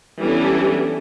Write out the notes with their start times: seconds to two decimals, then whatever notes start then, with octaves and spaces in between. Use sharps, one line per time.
0.19 E3 G3 B3 C#4 D4 A4